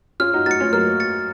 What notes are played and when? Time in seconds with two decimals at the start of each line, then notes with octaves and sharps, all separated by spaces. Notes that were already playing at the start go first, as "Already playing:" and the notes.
0.20 C#4 F4 F6
0.34 D#4 F#4
0.46 D#4 F#4 A6 C#7
0.60 C#4 F4
0.73 F#3 A#3 F6
1.00 A6 C#7